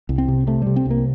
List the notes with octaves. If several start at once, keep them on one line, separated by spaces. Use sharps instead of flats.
C2
C4
C3
C3 A3
C3 G3
C4
C2 A#3